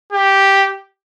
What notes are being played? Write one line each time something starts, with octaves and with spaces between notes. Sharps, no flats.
G4